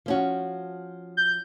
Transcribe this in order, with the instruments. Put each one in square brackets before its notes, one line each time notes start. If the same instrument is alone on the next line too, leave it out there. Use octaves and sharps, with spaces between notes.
[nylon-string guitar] F3 C#4 F#4
[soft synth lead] G6